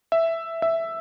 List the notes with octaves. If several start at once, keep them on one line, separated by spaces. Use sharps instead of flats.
E5
E5